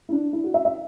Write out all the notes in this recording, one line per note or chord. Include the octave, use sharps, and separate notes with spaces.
E4
D4
E4
F#4
E5
E5